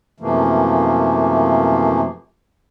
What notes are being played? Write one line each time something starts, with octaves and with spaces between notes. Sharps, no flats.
F#2 C3 E3 F3 A3 A#3